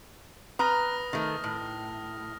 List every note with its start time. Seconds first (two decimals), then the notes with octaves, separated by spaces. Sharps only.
0.59 B4 A#5 D#6 F6 A#6
1.13 D#3 A3
1.44 A2